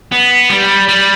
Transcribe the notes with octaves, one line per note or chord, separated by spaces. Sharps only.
B3
G3
G3